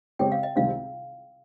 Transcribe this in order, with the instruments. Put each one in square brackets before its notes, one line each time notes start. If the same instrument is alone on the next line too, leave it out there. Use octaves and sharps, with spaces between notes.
[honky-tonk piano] C#3 G#3 C4 G4 C#5 [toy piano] G5
[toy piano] F5
D#5
[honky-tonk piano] C#2 C3 D#3 G3 C4 [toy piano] F5